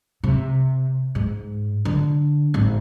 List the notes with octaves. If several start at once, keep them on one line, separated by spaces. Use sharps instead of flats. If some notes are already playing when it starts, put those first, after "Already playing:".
C3
G#2
D3
G#1